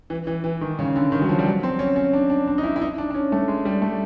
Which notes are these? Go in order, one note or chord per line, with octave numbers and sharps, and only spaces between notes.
E3
E3
E3
D#3
C#3
D3
D#3
F#3
F3
G3
F#3
C4
C#4
C#4
D4
D4
D4
D#4
E4
E4
D#4
D4
D4
C#4
A3
G#3
G3
A3